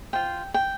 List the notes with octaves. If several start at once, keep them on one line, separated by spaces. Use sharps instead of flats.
F4 C5 G5
G5